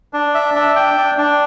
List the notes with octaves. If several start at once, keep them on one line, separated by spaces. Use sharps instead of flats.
D4
E5
D4
G5
D4
D4